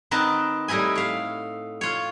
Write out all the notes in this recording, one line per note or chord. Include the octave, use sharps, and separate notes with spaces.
D#3 B3 C4 D#4 A#4 A5
A2 G3 D#4 E4 G#5
A3 F5
F4 C#5